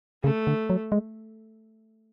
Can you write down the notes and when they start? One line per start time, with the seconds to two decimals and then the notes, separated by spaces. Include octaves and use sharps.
0.24 C#3 A3
0.47 D3
0.70 F#3
0.92 G#3